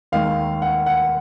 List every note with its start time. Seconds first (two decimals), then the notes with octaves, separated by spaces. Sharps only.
0.12 D#2 D#3 G#3 F5
0.62 F#5
0.86 F#5